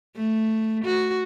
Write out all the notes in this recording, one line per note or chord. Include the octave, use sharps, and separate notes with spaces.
A3
F#4